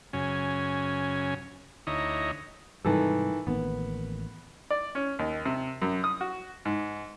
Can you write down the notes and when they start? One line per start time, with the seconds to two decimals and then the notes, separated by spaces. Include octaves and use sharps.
0.13 F#2 C#3 C#4 G#5
1.87 D2 D#4 E4 C#5 D#5 A#5
2.85 G#2 C3 D#3 E3 G3 A4
3.47 A1 D#3 A#3 B3
4.71 D5
4.95 C#4
5.19 D#2
5.46 C3
5.82 F#2
6.04 D#6
6.21 F#4
6.65 G#2